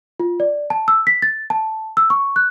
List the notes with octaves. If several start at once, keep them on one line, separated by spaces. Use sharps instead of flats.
F4
D5
A5
E6
B6
A6
A5
E6
C#6
F#6